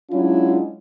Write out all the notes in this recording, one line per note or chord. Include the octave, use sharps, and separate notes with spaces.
F#3 G#3 C#4 D4 E4 F4